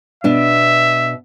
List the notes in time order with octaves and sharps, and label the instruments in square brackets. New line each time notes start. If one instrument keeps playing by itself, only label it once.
[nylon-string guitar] B2 D4 [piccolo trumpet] E5